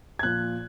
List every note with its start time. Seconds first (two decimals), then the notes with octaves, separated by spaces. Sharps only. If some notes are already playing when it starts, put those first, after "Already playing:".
0.19 G#6
0.23 A#2 F3 F#6